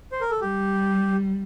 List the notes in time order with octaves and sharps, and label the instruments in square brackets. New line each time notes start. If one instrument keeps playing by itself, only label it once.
[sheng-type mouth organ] C5
A#4
A4
[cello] G3 [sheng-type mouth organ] G4